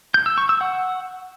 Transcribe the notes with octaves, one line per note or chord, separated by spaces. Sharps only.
G6
E6
C#6
E6
F#5